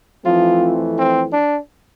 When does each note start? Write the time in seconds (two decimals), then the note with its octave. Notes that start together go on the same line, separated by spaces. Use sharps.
0.24 F2 E3 F3 A3 C4 F4
0.97 C4
1.33 D4